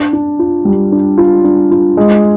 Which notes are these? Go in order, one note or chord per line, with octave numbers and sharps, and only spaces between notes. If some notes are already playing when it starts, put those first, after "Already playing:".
Already playing: D4
D4
F4
G3
D4
F4
D4
F4
G#3